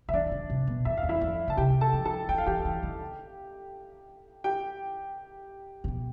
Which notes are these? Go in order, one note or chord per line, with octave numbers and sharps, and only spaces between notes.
D3 E5
E3 D4 D5
D3
C3
B2
E2 E5
F5
E2
E4 E5
F2
D3 A5
C3 G4 G5
A4 A5
F3
A4 A5
E3 G5
F5
E3 G4 G5
E3
D3
G4 G5
C3
B2